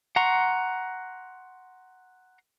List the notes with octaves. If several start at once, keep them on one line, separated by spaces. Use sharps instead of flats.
F#5 A#5 C6 C#6